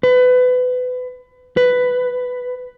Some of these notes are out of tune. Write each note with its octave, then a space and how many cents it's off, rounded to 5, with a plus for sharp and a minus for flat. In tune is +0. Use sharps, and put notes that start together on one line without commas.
B4 +25
B4 +10